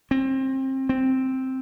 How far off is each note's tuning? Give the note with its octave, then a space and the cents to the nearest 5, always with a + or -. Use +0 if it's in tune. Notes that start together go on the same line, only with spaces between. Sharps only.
C4 +25
C4 +0